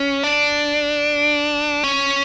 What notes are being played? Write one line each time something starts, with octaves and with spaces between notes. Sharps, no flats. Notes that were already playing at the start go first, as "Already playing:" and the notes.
Already playing: C#4
D4
C#4